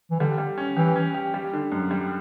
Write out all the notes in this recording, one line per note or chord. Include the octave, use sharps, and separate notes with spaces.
E3
D3 G3
G3
C#4
E3 G4
C#4
G4
G3
D3
F#2
G3